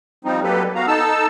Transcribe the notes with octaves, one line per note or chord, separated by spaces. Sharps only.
F3 G3 C4 D#4
F#3 G3 A#3 G4 A4 B4
B3 F#4 F5 A#5
D#4 A4 A5 E6